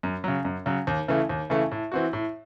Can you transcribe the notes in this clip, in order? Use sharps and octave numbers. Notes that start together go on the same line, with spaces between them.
F#2
C#3 F#3
F#2
C#3 F#3
D#2
C#3 E3 A3
D#2
C#3 E3 A3
A2
E3 C4 F#4
A2